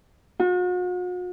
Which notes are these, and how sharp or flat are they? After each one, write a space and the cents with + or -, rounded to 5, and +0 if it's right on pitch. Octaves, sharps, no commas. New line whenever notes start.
F#4 -45